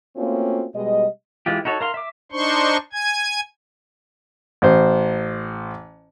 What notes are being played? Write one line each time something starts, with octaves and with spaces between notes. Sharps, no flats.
A3 A#3 C4 C#4 F4 F#4
B2 G3 G#3 D#5
E3 G#3 F4 G4
D#4 F#4 A4 C#5
A#4 F5 C6
E5 D6
D4 D#4 C5 C6 C#6
G#5 G#6
A1 C5